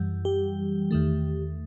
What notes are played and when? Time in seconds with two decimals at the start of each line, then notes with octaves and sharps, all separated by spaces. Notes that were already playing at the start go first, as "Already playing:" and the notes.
Already playing: F#2 E3 G3
0.25 G4
0.91 E2 D#3 A3